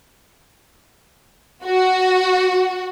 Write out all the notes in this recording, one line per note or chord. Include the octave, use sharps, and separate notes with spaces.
F#4